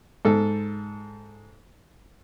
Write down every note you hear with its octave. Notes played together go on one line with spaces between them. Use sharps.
G#2 A4